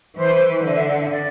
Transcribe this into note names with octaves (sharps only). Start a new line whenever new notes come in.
E3 C5
D3 E5
E5
F#5
E5
D5